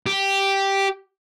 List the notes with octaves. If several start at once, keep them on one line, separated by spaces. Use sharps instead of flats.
G4